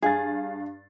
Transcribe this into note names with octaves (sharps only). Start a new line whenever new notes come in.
G2 G#4 F5 A6